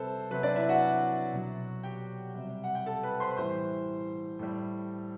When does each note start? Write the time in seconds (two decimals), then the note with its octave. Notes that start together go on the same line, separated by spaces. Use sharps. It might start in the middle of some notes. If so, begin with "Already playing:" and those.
Already playing: C3 G3 C4 A4 B4 C5
0.31 C3 F#3 B4
0.43 D4 D5
0.56 E4 E5
0.69 F#4 F#5
1.33 B2 F#3
1.83 G4 G5
2.35 C3 G3
2.64 F#5
2.75 G5
2.86 A4 A5
3.03 B4 B5
3.20 C5 C6
3.37 A2 E3 G3 C5 C6
4.39 A2 G3